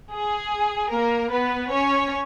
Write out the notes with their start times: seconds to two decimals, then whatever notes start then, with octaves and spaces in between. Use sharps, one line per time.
0.12 G#4
0.91 A#3 A#4
1.31 B3 B4
1.71 C#4 C#5